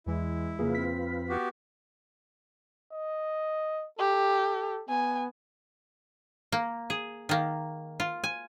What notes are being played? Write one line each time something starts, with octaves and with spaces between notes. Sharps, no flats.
E2 E3 G#3 E4
F2 C#3 A#3 F4 G#4 B4
C4 B6
B3 F#4 G4
D#5
G4 A4
B3 G#5
A#3
G#4
D#3 A#3
F4
G#5